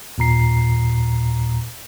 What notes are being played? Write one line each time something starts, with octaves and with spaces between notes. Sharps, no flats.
D#2 A#2 A#5 C7